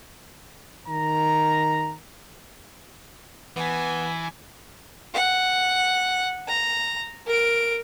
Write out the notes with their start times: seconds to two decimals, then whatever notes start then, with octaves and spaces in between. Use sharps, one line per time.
0.88 D#3 A#5
3.56 E3 B3 G#5
5.14 F#5
6.48 A#5
7.27 A#4 D7